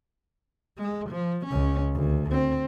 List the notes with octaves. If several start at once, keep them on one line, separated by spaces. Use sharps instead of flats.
G#3
F3
C#2 C#4
D2
C4